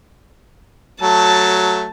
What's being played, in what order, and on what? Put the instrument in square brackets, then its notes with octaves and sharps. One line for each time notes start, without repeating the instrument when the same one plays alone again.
[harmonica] F#3 A3 [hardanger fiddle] A5